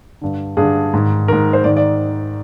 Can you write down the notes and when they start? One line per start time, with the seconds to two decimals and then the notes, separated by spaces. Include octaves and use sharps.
0.21 G2 D3
0.57 G2 D3 G#4
0.94 G#2 D#3
1.28 G#2 D#3 A#4
1.53 C5
1.64 G#2 D#3 D5
1.77 D5